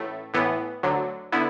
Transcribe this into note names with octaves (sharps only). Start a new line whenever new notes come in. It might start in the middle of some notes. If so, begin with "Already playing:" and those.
Already playing: A1 A2 A3
A2 E3 B3
D2 D3 F#3
D3 B3 E4